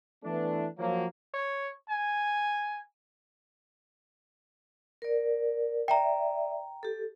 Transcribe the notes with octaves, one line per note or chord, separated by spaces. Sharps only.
E3 A3 B3 D4
F3 F#3 A#3
C#5
G#5
A#4 D5
D5 E5 G5 A#5
G4 A4